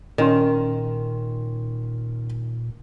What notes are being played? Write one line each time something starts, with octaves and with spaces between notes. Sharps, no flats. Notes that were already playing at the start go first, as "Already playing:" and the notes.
A#2 D#3 C#4 C6